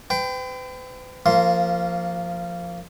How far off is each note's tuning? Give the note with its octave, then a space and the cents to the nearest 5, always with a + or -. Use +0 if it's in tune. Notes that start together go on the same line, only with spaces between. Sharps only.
B4 +45 G5 +0
F3 +0 A#3 -20 C6 +0